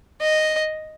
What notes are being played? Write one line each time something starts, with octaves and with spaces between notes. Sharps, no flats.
D#5